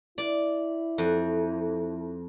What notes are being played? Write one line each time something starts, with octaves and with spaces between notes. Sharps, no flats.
E4 D5
F2